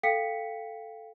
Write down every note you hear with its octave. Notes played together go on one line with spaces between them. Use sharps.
A4 F5 G5 B6 C#7